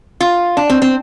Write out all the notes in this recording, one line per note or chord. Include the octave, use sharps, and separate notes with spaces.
F4
D4
C4
C4